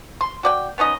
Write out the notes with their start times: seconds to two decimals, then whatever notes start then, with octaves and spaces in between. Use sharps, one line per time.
0.21 C6
0.43 F#4 D5 G5
0.78 B3 C#4 D#4 D#5